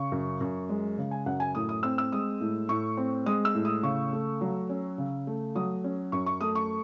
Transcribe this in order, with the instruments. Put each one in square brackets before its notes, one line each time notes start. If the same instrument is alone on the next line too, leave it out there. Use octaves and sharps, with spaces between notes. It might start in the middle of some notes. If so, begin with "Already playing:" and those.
Already playing: [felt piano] C#3 C#6
F#2
F#2
G#3
C#3
G#5
F#2 F#5
G#5
A2 D#6
D#6
C4 E6
E6
G#3 D#6
A2
A2 C#6
C4
G#3 D#6
E6
A2
D#6
C#3 C#6
A3
F#3
C#4
C#3
A3
F#3 D#6
C#4
F#2 C#6
C#6
A3 D#6
C#6